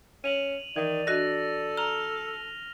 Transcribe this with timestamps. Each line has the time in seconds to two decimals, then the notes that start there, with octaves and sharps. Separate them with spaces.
0.24 C#4 D#7 F7 F#7
0.76 D#3 E3 D5
1.07 D4 F#4 A4 D#5 A#6
1.77 A#5 F6 F7